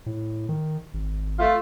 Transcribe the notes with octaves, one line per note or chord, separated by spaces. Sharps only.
A2
D#3
G#1
A3 F4